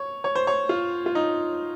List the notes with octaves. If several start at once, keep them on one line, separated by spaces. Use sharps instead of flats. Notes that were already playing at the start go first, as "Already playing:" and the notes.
Already playing: C#5
C#5
C5
C#5
F4
F4
D#4